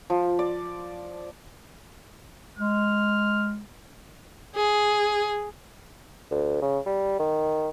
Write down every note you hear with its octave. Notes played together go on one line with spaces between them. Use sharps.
F3
D5
G#3 F6
G#4
D2
C#3
G3
D#3